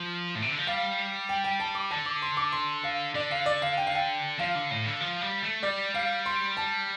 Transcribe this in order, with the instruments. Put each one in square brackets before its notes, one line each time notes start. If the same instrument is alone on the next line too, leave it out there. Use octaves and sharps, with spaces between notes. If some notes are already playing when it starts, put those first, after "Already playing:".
Already playing: [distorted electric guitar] F3
A2
C3
D3
F3
[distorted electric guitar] G3 [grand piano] F5
[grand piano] G5
G5
A5
D6
[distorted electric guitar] D3 [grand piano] A5
[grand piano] D6
C6
D6
C6
F5
[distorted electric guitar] D3 [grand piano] D5
[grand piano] F5
D5
F5
G5
F5
G5
[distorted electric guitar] F3 [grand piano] F5
[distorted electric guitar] D3
A2
D3
F3
G3
A3
[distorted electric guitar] G3 [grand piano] D5
[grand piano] F5
C6
A5